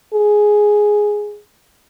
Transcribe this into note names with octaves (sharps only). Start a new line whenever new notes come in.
G#4